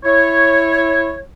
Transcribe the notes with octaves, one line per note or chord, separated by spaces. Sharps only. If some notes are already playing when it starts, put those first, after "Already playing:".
E4 C#5